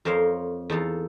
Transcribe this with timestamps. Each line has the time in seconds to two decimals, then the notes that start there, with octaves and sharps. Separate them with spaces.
0.05 F2 A#4 C5 C#5 F5
0.70 E2 D#4 A4 F5